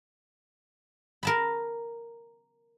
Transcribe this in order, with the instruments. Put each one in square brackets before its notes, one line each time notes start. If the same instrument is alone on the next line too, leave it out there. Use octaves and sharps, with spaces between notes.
[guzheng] A#4 A5 B5